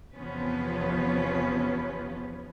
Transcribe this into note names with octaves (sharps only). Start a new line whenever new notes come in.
E2 C3 F3 B3 C#4 B4